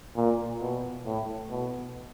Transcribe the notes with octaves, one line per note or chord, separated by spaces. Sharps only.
A#2
B2
A2
B2